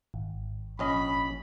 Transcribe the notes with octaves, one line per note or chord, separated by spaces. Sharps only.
G#1
A#1 C#4 D#5 B5